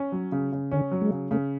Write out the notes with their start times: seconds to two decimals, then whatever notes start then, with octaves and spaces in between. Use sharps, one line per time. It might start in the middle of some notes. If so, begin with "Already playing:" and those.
Already playing: C#4
0.12 F#3
0.32 C#3
0.52 C#3
0.71 D3 C#4
0.91 F#3
1.02 G#3
1.11 C#3
1.31 C#3 A3